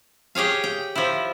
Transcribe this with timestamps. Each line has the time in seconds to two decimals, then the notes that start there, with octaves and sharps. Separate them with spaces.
0.35 G4 G#4 C#5 F5
0.64 G5
0.95 F3 E4